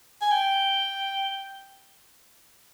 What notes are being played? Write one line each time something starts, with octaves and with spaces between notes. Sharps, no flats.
G#5
G5